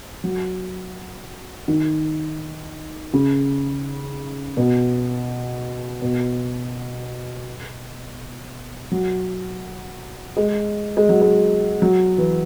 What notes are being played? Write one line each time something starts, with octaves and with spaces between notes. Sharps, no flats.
F#3
D#3
C#3
B2
B2
F#3
G#3
G#3
F#3
G#3
F#3
E3